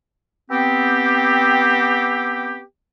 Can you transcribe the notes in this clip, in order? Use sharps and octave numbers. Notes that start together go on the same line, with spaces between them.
B3 C4 G4